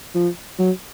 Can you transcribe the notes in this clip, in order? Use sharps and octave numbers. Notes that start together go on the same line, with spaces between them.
F3
F#3